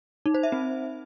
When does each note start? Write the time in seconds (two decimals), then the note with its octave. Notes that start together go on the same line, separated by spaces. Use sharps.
0.26 D#4
0.34 C5
0.43 E5
0.52 C4